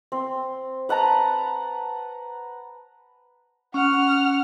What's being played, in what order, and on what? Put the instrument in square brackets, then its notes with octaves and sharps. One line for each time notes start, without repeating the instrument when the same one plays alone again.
[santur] C4
B4 F#5 A5 A#5
[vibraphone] C#4 [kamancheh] F#5 F6